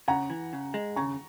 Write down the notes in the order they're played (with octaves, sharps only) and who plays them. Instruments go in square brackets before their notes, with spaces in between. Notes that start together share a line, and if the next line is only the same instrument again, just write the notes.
[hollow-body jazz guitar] C#3 [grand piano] F#5 A#5
[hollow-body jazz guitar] E3
C#3
G#3
[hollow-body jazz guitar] C#3 [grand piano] A#5 C#6